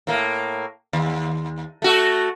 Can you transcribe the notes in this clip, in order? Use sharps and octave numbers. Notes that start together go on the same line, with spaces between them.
A2 A#3
D#2
A3 F#4 A4